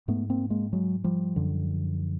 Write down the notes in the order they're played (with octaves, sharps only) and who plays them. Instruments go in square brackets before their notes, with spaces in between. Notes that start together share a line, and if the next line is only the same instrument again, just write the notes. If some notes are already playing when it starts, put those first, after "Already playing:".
[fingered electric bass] G#2 A3 B3
A#3 C4
G#3 A#3
F#3 G#3
F3 G3
F#2 D3